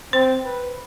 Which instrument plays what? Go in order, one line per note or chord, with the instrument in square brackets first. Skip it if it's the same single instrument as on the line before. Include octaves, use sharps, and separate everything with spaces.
[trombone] C4 [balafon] C5
[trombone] B4